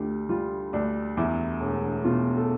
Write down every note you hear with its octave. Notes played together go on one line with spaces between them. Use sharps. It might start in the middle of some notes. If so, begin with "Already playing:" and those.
Already playing: D2 D3 F4 G4
G3 F4
D2 D4
E2 E4
E1
B2 F4
A4